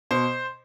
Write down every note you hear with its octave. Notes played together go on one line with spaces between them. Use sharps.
B2 C5